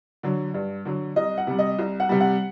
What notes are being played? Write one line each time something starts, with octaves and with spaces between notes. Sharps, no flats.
D3 F#3
G2
D3 F#3
C2 D#5
F#5
C3 G3
D#5
C2
F#5
C3 G3
F#5